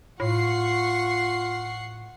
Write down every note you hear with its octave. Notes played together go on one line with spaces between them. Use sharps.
A2 F4 F#5 C#6 C7